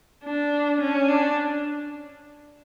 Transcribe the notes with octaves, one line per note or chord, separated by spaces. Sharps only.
D4
C#4
D4